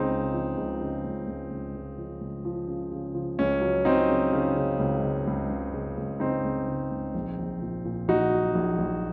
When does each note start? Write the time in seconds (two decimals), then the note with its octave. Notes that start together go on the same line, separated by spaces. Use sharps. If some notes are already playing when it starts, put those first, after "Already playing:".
Already playing: C#2 C#3 C4 D#4
0.10 C#2
0.33 F3
0.57 C#2
0.81 C#3
1.04 C#2
1.27 C#2
1.50 C#2
1.75 C#3
1.98 F3
2.21 C#2
2.45 F3
2.68 C#3
2.92 C#3
3.15 F3
3.39 C#2 C#4
3.62 F#3
3.85 F#3 C4 D#4
4.09 C#3
4.33 C#3
4.56 C#3
4.79 C#2
5.03 C#3
5.27 C#2
5.50 C#3
5.74 C#3
5.97 C#2
6.20 C#3 C4 D#4
6.45 C#2
6.68 C#3
6.91 C#2
7.14 A#1
7.38 A#1
7.62 A#2
7.85 A#2
8.08 A#1 D#4 F#4
8.32 F#3
8.55 A#1
8.79 A#1